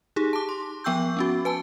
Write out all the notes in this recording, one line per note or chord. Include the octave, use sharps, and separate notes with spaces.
D#4 G4 G#4
A5 D6
C6
F3 B3 G5 C#6 E6 G6
B3 C#4 F#4
B4 G#5 A5